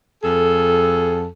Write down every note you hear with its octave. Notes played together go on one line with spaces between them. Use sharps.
F2 G#4 A4